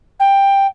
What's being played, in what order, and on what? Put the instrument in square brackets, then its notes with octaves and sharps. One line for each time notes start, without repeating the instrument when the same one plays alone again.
[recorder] G5